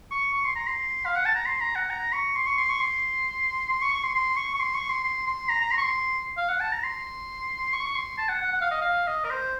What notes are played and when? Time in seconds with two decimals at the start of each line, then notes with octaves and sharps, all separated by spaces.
0.11 C#6
0.34 C#6
0.45 C6
0.56 A#5
0.67 C6
1.06 F5
1.16 F#5
1.26 A5
1.35 A#5
1.46 C6
1.61 A#5
1.75 F#5
1.90 A#5
2.13 C#6
2.35 C6
2.47 C#6
2.58 C6
2.69 C#6
2.80 C6
3.70 C6
3.82 C#6
3.93 C#6
4.03 C6
4.15 C6
4.37 C#6
4.54 C#6
4.60 C6
4.74 C#6
4.89 C6
5.04 C6
5.27 C6
5.49 A#5
5.60 A#5
5.72 C6
5.78 C#6
5.82 C6
6.37 F5
6.49 F#5
6.60 A5
6.72 A#5
6.83 C6
7.73 C#6
7.87 C#6
7.95 C6
8.18 A5
8.29 F#5
8.41 F#5
8.52 F#5
8.61 F5
8.71 D#5
8.81 F5
9.07 D#5
9.24 A#4
9.30 C5